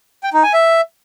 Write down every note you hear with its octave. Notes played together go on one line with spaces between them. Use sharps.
G5
D#4
G#5
E5